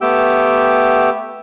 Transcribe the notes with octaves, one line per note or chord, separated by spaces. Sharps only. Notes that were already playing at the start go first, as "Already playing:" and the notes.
A3 B3 G4 G5 E6